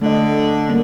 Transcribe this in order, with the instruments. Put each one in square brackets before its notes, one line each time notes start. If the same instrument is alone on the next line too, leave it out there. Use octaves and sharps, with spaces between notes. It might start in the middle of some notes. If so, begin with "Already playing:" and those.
[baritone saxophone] D3 [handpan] A3 D#5
[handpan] G3 A#3 C#4